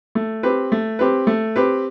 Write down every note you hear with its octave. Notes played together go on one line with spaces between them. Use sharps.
A3
C4 G4 B4
A3
C4 G4 B4
A3
C4 G4 B4